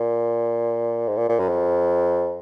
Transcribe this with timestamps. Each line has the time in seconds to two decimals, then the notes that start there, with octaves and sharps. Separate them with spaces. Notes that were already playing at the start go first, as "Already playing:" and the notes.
Already playing: A#2
1.08 G#2
1.17 A#2
1.29 A#2
1.39 F#2
1.48 F2